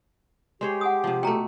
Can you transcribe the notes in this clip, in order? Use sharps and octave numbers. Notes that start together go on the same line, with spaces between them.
G#3 G4 C5 C#5
F#5 G#5 D#6
C3 F3
B2 A3 G5 A#5